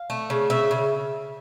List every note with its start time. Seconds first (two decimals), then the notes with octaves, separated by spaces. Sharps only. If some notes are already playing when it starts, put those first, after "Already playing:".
Already playing: F5
0.10 A3
0.30 C#3
0.50 C#3 E5
0.71 C#3